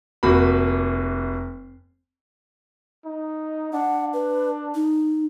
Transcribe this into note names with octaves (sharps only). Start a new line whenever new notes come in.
F1 F3 A#3 F#4 B5
D#4
D4 F#5
B4
D#4